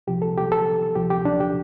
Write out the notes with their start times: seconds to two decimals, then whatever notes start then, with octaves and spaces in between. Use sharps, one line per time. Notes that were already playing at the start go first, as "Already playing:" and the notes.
0.07 C2 C3 F3 G4
0.22 A4
0.37 G4
0.52 A4
0.95 D2 C3 F3 G4
1.10 G4
1.25 D4
1.40 G4